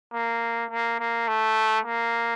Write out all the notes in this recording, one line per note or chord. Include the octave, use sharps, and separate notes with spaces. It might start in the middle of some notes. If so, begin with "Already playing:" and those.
A#3
A#3
A#3
A3
A#3